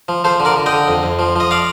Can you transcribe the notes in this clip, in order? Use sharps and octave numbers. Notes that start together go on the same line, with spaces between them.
F3
F3 A4 C5
D3
A#4 D5
D3
D#5 G5
D3
F2
F2
F3
F3 D#5
D5 F5